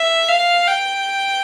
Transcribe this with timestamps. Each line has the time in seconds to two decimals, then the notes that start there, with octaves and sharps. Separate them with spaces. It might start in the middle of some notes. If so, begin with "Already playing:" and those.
Already playing: E5
0.28 F5
0.67 G5